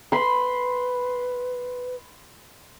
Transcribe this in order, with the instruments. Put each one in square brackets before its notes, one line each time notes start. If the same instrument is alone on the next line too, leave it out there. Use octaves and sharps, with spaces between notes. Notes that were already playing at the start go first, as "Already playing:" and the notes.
[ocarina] B4 [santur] B5 C6